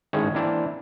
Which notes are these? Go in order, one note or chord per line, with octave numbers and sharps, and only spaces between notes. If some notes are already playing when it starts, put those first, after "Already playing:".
G#1 A2 D#3 G#3 C#4
E3 A#3 C4 D4 E4